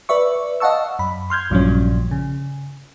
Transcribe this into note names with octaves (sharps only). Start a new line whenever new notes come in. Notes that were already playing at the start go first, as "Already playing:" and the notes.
B4 D5 E5 C#6
D#5 F5 F#5 A5 C#6 E6
F#2 B5
C6 F6 G6 G#6
A#1 G2 A#2 F3 F#3 C#4
C#3